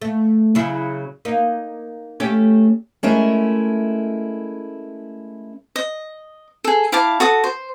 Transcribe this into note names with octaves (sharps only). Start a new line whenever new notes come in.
A3
C#3 F#3 E4
A#3 D#4
A3 C#4 G4
G#3 A3 C#4 E4 A#4 E5
D#5
G#4 A4
E4 F5 A5 D6
F#4 A4 D#6
C5